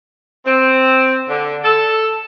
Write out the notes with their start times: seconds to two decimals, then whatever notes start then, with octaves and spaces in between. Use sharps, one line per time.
0.46 C4
1.29 D3
1.64 A4